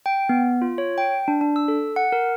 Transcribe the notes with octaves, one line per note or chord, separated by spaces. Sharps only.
G5
B3
F4
C#5
G5
D4
D4
E6
A4
F#5
A#4